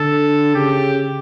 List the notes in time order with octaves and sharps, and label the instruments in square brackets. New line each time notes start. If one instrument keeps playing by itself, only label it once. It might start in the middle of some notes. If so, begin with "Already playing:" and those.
Already playing: [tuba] D3 [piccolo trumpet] A4
[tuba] C#3 [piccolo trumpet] G4